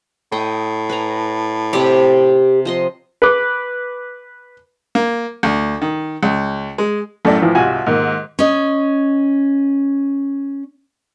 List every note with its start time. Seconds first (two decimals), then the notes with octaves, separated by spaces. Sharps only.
0.32 A2 D#5 G5
0.89 B4 G#5 A#5
1.73 C3 C4 G4 D5
2.65 F3 D#5 C6
3.22 B4 D6
4.95 A#3
5.43 D2
5.82 D#3
6.23 C#2
6.78 G#3
7.25 F#2 A2 A3 A4 D5
7.42 A2 E3 F3 F4
7.55 C2 G#2 F4 F#4 G#5
7.86 G#2 D#3 A#3
8.39 C#4 D#5